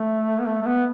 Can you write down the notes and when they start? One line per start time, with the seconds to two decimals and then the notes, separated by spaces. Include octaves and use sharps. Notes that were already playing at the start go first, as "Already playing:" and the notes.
Already playing: A3
0.39 B3
0.47 A3
0.62 A3
0.66 B3